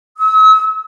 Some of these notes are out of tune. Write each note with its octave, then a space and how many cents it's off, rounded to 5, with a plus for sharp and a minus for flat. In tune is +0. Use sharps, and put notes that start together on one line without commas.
E6 -40